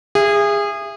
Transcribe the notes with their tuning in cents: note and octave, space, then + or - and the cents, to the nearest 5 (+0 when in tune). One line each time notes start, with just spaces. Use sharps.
G#4 -25 E5 +25